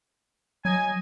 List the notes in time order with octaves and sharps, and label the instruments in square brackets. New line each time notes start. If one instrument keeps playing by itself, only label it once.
[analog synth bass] F#3 [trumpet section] D#5 G#5